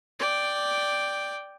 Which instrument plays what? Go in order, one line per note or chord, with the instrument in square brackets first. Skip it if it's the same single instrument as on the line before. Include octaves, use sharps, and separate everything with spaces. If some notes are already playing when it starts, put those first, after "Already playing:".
[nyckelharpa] D5 G5